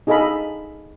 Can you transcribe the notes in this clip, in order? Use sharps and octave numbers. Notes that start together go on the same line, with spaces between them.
D#4 G#4 A4 D#5 F5 B5